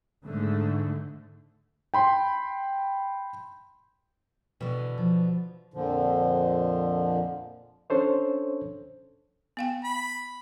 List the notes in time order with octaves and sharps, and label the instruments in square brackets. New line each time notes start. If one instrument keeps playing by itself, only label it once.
[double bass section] G#2 D3 A3
[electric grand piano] G5 B5 C6
[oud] B2 D3 [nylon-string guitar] E3
[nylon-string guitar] F3
[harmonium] F2 A#2 D3 F3
[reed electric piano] C#4 D4 A4 C5 C#5
[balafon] B3 F5 G5
[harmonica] B5